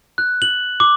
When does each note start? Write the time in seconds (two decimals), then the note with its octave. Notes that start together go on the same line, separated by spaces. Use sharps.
0.18 F#6
0.42 F#7
0.80 D6